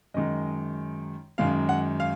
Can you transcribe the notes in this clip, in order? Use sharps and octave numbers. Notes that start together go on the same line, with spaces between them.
F#2 D#3 G#3 D#5
F#2 D#3 G#3 F5
F#5
F5